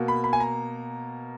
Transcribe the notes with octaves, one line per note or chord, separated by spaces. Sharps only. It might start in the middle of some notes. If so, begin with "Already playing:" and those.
Already playing: B2 A#3
B5
B5
G#5
A#5